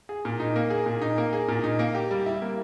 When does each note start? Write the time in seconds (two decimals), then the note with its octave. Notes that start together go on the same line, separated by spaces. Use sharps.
0.09 G#4
0.25 A#2
0.40 D#4
0.56 A#3
0.70 G#4
0.86 A#2
1.02 D#4
1.18 A#3
1.33 G#4
1.48 A#2
1.64 D#4
1.79 A#3
1.95 G4
2.11 G3
2.26 E4
2.42 A#3